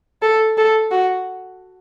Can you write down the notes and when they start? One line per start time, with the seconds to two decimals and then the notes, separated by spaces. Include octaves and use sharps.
0.22 A4
0.57 A4
0.91 F#4